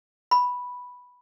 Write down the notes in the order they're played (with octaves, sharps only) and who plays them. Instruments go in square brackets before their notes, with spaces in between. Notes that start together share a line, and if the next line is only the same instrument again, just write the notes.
[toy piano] B5